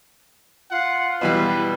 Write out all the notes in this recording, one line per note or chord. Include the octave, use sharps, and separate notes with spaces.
F4 F#5
B2 E3 G3 B4